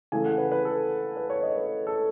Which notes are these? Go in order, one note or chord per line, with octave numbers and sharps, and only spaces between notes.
C#3 E3 A3 G#5
F#5
B4
B4
A4
B4
C#5
D#5
B4
A4